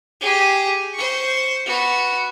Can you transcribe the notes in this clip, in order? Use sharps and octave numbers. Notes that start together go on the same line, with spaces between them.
G4 G#4
C5 C#6
B3 F#4